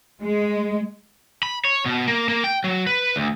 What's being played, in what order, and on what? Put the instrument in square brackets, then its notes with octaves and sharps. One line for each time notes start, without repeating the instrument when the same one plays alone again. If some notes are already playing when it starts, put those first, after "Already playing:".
[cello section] G#3
[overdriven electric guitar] B5
C#5
B2
A#3
A#3
G5
F#3
B4
D2